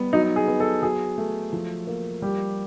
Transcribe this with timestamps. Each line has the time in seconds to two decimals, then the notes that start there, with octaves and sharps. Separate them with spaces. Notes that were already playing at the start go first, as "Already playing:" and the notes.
Already playing: G3 B3
0.13 F#3 D#4
0.36 G#4
0.48 B3
0.60 A4
0.83 F#3 G#4
1.18 A3
1.53 F3
1.87 A#3
2.22 G3 G4